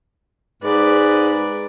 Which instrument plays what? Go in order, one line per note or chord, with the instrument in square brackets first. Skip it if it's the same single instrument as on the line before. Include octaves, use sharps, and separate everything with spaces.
[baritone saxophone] G#2 [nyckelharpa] B4 D5